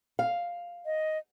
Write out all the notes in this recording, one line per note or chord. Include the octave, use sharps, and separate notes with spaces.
F5
D#5